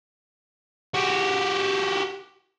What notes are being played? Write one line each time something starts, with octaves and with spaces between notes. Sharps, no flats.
F#4 G4